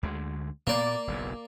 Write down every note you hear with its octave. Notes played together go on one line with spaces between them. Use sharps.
D2 D3 G#3
A#2 A#3 B3 D5
F#1 B1 F#2